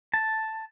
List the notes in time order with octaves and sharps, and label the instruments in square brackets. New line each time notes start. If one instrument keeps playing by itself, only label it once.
[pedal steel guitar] A5